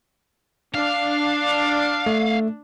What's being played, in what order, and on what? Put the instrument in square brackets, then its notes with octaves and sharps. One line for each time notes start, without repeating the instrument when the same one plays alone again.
[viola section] D4 [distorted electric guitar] F5
[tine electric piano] A3